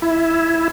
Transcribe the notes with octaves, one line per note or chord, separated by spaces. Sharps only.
E4